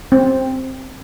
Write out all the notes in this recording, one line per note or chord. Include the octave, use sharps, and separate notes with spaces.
C4